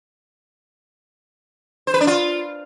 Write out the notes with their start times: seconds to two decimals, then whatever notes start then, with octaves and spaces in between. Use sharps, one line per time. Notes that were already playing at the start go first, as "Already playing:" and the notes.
1.87 C5
1.94 B4
2.01 D4
2.07 F4